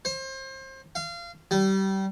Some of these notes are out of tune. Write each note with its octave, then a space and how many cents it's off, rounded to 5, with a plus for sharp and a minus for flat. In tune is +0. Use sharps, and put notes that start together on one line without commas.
C5 +30
F5 -25
G3 -25